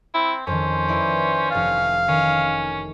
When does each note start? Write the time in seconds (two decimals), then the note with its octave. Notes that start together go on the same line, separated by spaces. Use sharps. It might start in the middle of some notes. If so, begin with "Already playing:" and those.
0.14 C4 E4
0.47 F2 D#3 C#4 C5
0.88 E4 B4 D5
1.51 F1 F5 A6
2.08 D#3 C#4